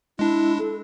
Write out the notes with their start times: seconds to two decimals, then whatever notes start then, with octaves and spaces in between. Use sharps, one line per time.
0.19 G#3 D4 E4
0.59 A4